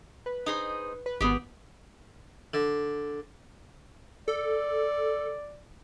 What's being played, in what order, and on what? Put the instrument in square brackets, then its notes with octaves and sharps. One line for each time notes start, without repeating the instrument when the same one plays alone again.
[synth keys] B4
[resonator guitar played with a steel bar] D#4 G#4 C5
[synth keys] B4
[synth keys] G#1 B3 [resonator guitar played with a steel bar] G4 G#4
[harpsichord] D3
[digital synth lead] A4 [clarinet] D5